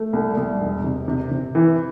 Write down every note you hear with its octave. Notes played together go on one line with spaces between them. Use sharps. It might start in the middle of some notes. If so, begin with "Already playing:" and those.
Already playing: A3
C2
C2
E1
C3
C3
C3
E3